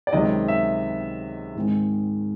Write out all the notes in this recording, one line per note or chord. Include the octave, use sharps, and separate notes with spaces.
D5
C#2 C3 D#3 F#3 D#5
E5
G#2 D#3 G#3 C4